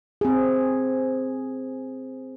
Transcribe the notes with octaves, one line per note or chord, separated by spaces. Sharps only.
C4 G#4